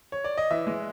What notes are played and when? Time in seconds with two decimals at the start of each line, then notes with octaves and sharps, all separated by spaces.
0.12 C#5
0.24 D5
0.38 D#5
0.50 E3 E5
0.67 G#3